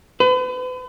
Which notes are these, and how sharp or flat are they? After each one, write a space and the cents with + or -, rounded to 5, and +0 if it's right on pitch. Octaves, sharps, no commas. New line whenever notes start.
B4 +40